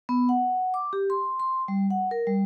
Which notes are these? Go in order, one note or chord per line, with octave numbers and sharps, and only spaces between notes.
B3
F#5
D6
G4
C6
C6
G3
F#5
A#4
G3